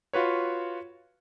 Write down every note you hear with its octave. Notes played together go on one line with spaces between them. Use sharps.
F4 F#4 B4 C#5